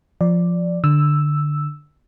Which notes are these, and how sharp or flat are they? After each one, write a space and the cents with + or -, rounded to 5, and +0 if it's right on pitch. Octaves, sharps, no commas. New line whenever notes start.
F3 +0 D5 +0
D3 +10 E6 +0